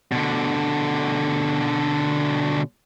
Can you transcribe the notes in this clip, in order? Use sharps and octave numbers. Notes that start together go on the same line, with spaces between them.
B2 D3